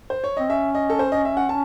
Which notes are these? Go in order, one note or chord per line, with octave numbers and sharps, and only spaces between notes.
C5
C#5
C4 D#5
C#4 E5
D#5
A4
C5
D#5
E5
F#5
A5